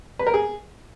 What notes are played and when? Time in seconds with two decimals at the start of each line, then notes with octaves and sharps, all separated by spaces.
0.19 B4
0.27 A#4
0.34 G#4